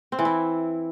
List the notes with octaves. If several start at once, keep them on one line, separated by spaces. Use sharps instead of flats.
C4
E3
E4